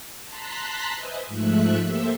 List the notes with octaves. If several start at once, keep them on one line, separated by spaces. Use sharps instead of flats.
A5 A#5 C6 F#6 B6
B4 C5 D#5 E5 G#5
G#2 F3 A3 E5 F#6
A#3 G4 A4 C5 E5